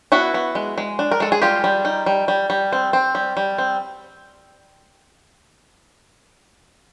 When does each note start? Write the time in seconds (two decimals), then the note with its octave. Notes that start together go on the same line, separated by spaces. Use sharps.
0.12 B3 E4 F#4
0.34 B3
0.55 G#3
0.78 G#3
0.99 D4
1.11 A#4
1.20 G#3 A4
1.32 G#4
1.42 G3 F4 G4
1.64 G3
1.85 D#4
2.06 G3
2.28 G3
2.50 G3
2.73 C4
2.93 C4
3.15 G3
3.37 G3
3.58 C4